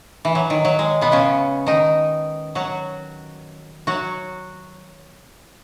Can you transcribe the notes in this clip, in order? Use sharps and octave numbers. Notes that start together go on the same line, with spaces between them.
E3
F#3
D#3
F#3
G#3
B2 B3
C#3 C#4
D#3 D#4
F#3 F#4
F#3 F#4